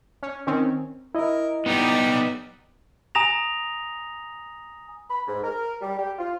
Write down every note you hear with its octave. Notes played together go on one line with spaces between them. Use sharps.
C#4
D#3 C4 C#4
E4 A#4 D#5
G3 B3 D#4
G#5 A#5 D#6 A#6 F7
B5
G#2
A#4
G3
G4
F4